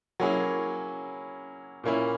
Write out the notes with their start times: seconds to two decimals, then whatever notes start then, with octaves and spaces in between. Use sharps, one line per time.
0.20 F#3 A#3 C#4 E4 G#4
1.84 A#2 A#3 C#4 E4